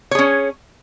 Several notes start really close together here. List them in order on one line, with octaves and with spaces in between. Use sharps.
C#5 G#4 C#4